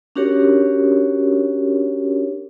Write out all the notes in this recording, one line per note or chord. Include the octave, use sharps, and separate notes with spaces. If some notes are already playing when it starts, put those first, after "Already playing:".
C#4 D4 F#4 G4 A#4 C#5